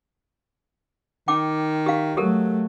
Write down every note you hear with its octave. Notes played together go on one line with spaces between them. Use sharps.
D#3 G5 D6
G4 F5
F#3 A3 G4 A4 A#4